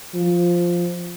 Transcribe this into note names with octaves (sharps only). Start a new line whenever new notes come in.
F3